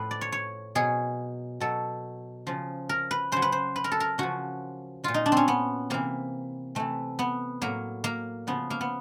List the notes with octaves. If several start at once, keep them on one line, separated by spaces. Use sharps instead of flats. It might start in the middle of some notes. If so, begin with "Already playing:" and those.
Already playing: A2 F3 B4
D5
C#5
C#5
B2 F#3 G#4
B2 F#3 A4
C#3 F3
A#4
B4
C#3 F#3 C5
B4
C5
B4
A#4
A4
A#4
C#3 F3 F#4
A#2 F#3 F4
D#4
D4
C4 C#4
B3
C3 E3 A#3
C3 E3 A3
B3
A2 F#3 A#3
A#3
C#3 F3 B3
A#3
B3